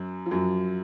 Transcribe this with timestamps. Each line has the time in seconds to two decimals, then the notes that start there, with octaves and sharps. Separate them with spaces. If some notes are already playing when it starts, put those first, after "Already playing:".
Already playing: F#2 F#3
0.26 F3
0.31 F#2 F#3